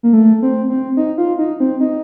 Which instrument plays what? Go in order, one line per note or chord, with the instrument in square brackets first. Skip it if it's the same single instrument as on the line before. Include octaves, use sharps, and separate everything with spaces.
[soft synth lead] A#3
A3
C4
C4
D#4
F4
D#4
C4
D#4